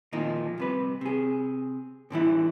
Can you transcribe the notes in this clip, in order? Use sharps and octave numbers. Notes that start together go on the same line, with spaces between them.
F2 A#2 D#3 F3 D#4
C2 C3 B4
C3 G#4
A2 D3 E3 E4